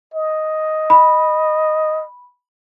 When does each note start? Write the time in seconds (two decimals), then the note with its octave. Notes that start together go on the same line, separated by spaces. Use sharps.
0.14 D#5
0.90 B5